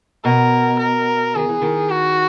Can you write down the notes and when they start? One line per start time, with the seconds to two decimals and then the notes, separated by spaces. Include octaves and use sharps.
0.25 B2 A#4
0.79 A#4
1.35 D#3 G#4
1.49 E3
1.62 D#3
1.90 F#4